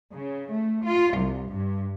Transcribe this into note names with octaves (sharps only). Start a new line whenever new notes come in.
C#3
A3
F4
C2
G2